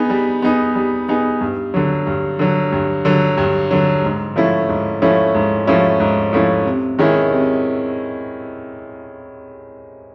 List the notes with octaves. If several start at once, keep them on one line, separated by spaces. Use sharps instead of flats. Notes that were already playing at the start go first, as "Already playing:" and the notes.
Already playing: B3 D#4 G#4
G3
B3 D#4 G#4
G3
B3 D#4 G#4
G2
D3 F#3
G2
D3 F#3
G2
D3 F#3
G2
D3 F#3
G#2
F3 A3 C#4 E4
G#2
F3 A3 C#4 E4
G#2
F3 A3 C#4 E4
G#2
F3 A3 C#4 E4
C3
D#3 G#3 C#4 E4
C3